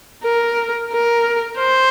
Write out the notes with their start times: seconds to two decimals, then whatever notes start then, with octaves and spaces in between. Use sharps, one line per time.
0.24 A#4
0.92 A#4
1.58 C5